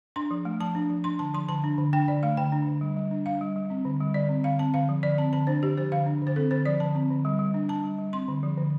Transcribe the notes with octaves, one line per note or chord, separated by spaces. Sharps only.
D4 C6
F3
A3
F3 A5
D4
F3
D4 C6
D3 A5
F3 C6
D3 A5
D4
D3
D4 G5
D3 D5
A3 F5
D3 G5
D4
D3
G3
G3
D4
D4 F5
G3
G3
C4
D3
G3
D3 D5
C4
D3 F5
C4 A5
D3 F5
F3
D3 D5
C4 A5
D3 A5
D4 C5
D3 G4
F3 C5
D3 F5
D4
D3 C5
C4 A4
D3 C5
F3 D5
D3 A5
C4
D3
G3
G3
D4
D4 A5
G3
G3
C4 C6
D3
F3
D3